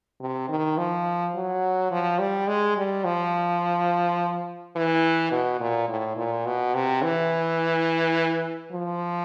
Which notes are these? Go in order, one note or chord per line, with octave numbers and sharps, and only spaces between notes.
C3
D#3
F3
F#3
F3
G3
G#3
G3
F3
E3
B2
A#2
A2
A#2
B2
C3
E3
F3